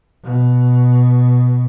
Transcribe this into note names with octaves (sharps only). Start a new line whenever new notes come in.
B2